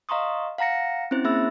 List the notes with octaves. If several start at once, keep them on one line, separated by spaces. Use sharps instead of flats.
D#5 F5 A#5 C6 C#6 D#6
F5 F#5 A#5 A#6 C#7
C4 C#4 E4 C5
A#3 G#4 E5 B5 E6 A6